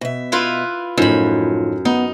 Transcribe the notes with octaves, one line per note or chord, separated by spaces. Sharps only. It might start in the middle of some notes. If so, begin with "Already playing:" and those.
B2 E5
E4 F4 B4
F#2 A2 F3 D#4 B5
B3 D#4